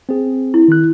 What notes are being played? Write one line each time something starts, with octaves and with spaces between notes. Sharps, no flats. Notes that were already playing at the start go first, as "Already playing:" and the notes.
C4 G#4
E4
D#3 F#6